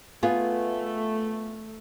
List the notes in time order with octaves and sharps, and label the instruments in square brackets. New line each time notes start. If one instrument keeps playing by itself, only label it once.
[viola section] A3 [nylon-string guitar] B3 F4 G#4